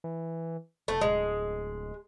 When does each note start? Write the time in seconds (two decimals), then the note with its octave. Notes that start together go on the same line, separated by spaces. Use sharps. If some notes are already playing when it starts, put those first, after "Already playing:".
0.04 E3
0.88 F1 A3
1.01 D1 G#3